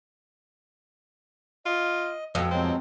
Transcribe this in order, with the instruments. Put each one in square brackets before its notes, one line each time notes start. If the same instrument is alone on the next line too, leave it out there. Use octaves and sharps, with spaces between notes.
[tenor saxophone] F4 [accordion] D#5
[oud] F2 [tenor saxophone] B2
[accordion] B2 F#3 G#3 [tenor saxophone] C4